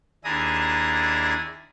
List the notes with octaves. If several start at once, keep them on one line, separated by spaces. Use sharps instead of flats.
D#2 D4 E4 G#4 A#5 D#6